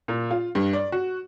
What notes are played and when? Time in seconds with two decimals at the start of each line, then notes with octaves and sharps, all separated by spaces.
0.08 A#2
0.31 F4
0.55 G2
0.73 D5
0.92 F#4